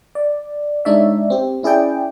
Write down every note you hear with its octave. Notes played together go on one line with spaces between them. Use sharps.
D5
G#3 D4 D#4 C#5 D5 E5
C4 G4
C#4 E4 G#4 D5 G5